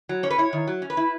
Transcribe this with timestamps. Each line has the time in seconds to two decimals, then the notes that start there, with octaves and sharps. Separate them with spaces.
0.09 F#3
0.23 C#4 C#5
0.30 B4
0.38 E4 C#5
0.53 D#3
0.67 F#3
0.82 C#4
0.90 B4
0.97 E4